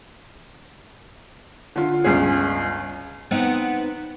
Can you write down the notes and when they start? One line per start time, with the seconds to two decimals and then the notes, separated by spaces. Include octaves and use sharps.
1.76 D3 F4
2.04 G1 C#2 G#4
3.31 B3 C4 D#4